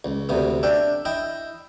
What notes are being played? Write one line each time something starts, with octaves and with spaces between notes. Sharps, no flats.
C#2
D2 C3 B3
D4 E5 G5
E4 D#5 G5